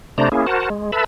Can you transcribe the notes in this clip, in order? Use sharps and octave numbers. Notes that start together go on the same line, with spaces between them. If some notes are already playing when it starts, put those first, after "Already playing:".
C3 A3 D4 C5 D5 A#5
A#3 C#4 E4 G#4
F#4 A#4 C5 F#5 A5
G#3
A4 B4 E5 A5 B5